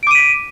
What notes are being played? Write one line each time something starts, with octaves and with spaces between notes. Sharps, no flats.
D6 B6 D7 D#7